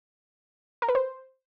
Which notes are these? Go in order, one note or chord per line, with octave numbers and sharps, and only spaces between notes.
A#4
B4
C5